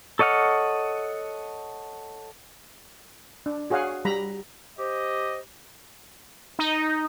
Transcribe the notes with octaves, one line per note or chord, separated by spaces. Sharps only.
A4 C#5 D#5 F#5 F6
D4
F#4 G#4 C#5 F5 F#5
G3 A#5 B5
G4 C5 D#5
D#4